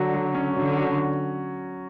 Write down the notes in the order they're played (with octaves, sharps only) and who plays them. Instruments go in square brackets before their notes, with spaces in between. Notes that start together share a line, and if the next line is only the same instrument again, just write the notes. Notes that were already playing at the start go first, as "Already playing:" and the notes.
Already playing: [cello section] D3 [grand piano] F#3 F#4
[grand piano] F#3
C#4
[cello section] D3 [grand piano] F#3
[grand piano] F#4